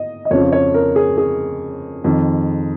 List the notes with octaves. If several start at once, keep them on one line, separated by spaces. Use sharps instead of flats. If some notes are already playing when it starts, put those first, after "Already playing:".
Already playing: D#5
D#5
F2 C#3 F3 C#5
C#5
A#4
G#4
G#4
F2 D#3